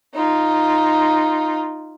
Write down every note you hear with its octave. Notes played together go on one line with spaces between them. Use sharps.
D#4 F4